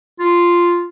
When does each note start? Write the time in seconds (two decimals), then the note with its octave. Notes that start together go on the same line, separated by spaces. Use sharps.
0.20 F4